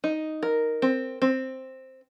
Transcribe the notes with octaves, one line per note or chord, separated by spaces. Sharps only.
D#4
A#4
C4
C4